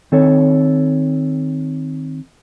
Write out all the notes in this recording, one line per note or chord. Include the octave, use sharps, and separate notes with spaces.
D#3 C4 A4 C#5